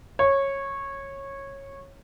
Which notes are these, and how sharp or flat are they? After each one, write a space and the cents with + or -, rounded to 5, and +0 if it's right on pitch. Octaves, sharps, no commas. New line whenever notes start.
C#5 -15